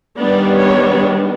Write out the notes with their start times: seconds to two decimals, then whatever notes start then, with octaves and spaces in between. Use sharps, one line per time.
0.18 D#3 G3 B3 D4 D5
0.60 C#5